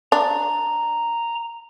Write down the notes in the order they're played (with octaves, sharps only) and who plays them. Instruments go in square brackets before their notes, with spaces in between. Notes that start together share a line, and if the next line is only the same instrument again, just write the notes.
[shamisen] D4 [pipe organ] A#5